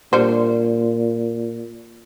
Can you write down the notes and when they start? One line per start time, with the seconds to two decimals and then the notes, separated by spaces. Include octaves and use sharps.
0.13 A#2 G3 D4 C5